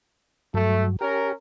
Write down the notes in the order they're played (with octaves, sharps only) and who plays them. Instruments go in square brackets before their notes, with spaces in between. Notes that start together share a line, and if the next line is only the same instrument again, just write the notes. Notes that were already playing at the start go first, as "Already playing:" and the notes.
[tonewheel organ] G2 F#3 [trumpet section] A3
[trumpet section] C#4 A#4 [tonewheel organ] G4